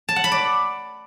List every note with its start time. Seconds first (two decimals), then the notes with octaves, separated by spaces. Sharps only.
0.09 A5
0.16 F#5
0.24 B5
0.32 D5